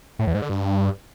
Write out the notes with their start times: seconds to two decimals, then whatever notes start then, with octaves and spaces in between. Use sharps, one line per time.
0.19 A2
0.27 E2
0.34 G#2
0.42 D3
0.50 G2